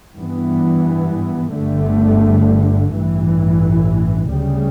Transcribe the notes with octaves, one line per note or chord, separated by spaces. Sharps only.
G2 E3 B3
G1 G2 D3 A3
A1 G2 E3
D2 C#3 G3